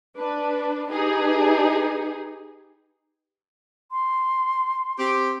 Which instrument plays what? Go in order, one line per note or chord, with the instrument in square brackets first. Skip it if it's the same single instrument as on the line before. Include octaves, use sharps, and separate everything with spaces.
[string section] D4 B4
D#4 G4 G#4 B4
[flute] C6
[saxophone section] C4 G4